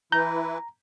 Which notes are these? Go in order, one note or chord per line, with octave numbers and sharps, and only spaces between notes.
E3 E4 B4 A#5 G6